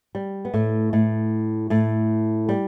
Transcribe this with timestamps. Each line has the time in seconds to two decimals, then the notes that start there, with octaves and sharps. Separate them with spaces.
0.15 G3
0.45 B3
0.54 A2 A3
0.93 A2 A3
1.70 A2 A3
2.49 G3